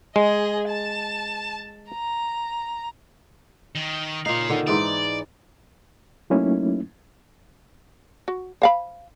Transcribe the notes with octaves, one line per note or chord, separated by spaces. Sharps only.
G#3 G#4 D#5
A5
A#5
D#3
A#2 C#3 D#4 F5
D3 D#3
G#2 E3 D#4 D5
F#3 A3 A#3 C#4 D#4 E4
F#4
C5 F5 B5